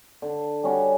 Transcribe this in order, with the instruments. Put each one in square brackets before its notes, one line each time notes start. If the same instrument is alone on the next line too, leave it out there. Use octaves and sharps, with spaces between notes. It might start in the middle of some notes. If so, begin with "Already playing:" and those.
[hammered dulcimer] D3
G3 C#4 F#4